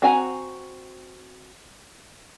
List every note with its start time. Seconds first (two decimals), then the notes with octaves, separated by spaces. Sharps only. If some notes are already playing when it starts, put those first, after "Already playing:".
0.02 C4 F#4 F#5 G#5 A#5